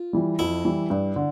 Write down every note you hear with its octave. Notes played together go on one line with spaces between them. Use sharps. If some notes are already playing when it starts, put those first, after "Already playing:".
Already playing: F4
E3 G3
F2 E4
E3 G3
G2
D3